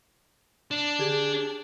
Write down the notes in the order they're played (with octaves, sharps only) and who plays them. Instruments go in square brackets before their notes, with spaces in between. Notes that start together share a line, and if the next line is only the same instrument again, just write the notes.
[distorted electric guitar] D4
[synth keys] D3 G4 G#4